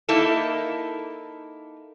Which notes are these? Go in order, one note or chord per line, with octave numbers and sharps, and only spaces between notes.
A#3 D#4 E4 A4